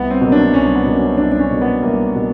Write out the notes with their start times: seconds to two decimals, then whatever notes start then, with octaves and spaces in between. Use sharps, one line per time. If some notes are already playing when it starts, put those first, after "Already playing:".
Already playing: C2 B3
0.11 C4
0.21 B2 F#3 A#3
0.32 D4
0.53 C2 C#4
0.75 B3
0.85 B2 F#3 A#3
0.97 C#4
1.17 C2 D4
1.32 D4
1.39 C#4
1.50 B2 F#3 A#3
1.61 B3
1.83 C2 A#3
2.15 B2 F#3 A#3